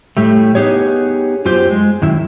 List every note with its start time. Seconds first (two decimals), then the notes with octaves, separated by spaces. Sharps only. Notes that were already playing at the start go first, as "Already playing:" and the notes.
0.17 A2 G3 A3
0.55 B3 D#4 G4 G#4 C#5
1.45 F#2 F4 G4 C5
1.70 G#3
2.02 F#2 D#3 E4